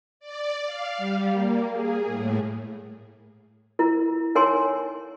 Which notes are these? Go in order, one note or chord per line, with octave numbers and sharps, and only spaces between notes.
D5
F5
G3
A#3
G#4
A2
E4 A#4
D#4 A#4 C#5 G#5 C6